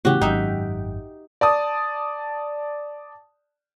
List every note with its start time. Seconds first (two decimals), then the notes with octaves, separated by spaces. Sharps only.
0.05 E2 A2 C#3 F#4 G4
0.21 G#1 F#2 D#4 E5 G5
1.41 D5 A5 D#6